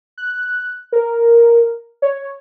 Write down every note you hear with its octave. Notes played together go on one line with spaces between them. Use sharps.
F#6
A#4
C#5